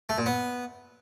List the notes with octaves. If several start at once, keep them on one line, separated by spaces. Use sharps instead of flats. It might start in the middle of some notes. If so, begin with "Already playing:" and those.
A3
A#2
B3